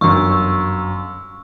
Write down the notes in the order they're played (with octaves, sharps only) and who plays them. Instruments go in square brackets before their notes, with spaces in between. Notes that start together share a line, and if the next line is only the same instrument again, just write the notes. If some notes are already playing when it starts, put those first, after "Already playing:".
[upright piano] G1 F#2 [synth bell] C#6 E6